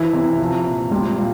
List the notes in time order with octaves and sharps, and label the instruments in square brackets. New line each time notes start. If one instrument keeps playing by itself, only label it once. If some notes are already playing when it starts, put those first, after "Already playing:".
Already playing: [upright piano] E3 E4
C3
F3
A#2
G3 F4
A#2